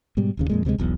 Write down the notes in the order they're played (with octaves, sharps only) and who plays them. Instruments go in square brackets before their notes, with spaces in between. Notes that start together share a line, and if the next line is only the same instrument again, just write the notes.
[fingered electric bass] G#2 B2 G3
D1 D#2 C#3
F2 A#2 G#3
D2 C3 F3 G#3
E1 B1 E2